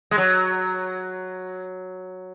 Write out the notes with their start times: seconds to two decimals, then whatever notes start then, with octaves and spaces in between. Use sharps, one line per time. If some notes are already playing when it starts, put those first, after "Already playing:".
0.11 G#3
0.18 F#3